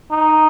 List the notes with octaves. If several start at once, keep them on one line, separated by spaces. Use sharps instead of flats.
D#4